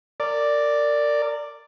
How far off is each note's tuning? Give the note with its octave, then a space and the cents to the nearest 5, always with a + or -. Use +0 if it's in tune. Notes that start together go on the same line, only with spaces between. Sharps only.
A#4 -25 D5 +0